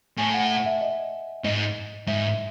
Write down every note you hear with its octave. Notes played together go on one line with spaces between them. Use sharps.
A2 G#5
F#5
F#5
E5
D#5
G#2 D#5
G#2 E5